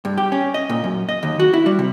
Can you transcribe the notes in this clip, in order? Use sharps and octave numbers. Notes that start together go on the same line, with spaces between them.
G2
G4
C#4
D#5
A#2
F#2
D#5
D#2
F#4
E4
G3
C3